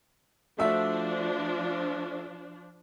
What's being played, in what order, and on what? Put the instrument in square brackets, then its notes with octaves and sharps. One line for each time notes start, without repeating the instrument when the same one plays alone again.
[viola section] F3 D4 [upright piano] A3 F#4 E5